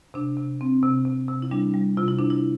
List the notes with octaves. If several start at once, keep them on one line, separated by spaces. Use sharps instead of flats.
C3 D4
C3
C4
C3
C3
C3
E4
G3 D4
G3
C3 F4
E4
C3 D4
E4